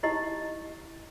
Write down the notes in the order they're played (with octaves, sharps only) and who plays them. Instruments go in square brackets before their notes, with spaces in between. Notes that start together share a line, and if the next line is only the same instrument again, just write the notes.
[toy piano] D#4 E4 G4 D#5